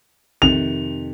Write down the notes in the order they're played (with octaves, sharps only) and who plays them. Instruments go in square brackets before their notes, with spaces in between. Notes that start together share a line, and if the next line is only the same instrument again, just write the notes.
[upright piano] F2 C3 D#3 [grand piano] F7